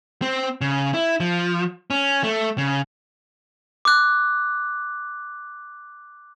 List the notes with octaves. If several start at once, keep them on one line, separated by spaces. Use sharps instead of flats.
C4
C#3
E4
F3
C#4
A3
C#3
D6 F#6